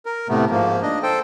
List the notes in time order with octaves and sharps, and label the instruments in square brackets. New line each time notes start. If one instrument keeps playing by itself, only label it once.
[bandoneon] A#4
A2 C3 A3 B3
G#2 F3 A#3
D4 D#5
A4 C5 G5